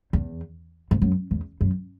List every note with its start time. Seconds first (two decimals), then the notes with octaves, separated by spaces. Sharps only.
0.13 E2
0.91 G#2
1.02 F#2
1.31 E2
1.61 F#2